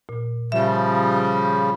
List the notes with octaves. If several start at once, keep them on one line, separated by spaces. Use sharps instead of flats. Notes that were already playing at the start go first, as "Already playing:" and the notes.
A#2
C#3 F3 G3 E5